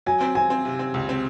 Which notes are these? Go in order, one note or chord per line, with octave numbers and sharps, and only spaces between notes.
F#3 G#5
C4
C4 G#5
C4
C3
C4
C#2
C4